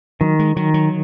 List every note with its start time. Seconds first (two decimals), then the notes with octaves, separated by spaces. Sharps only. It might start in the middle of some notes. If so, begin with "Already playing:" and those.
0.21 D#3 F#3
0.39 G#3
0.57 D#3 F#3
0.74 F#3